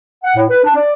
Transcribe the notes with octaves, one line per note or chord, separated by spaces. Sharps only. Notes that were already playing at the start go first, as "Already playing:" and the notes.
F#5
A2
B4
D4
D5